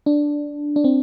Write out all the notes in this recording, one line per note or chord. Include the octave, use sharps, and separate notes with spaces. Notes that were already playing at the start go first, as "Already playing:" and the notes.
D4
D4
C4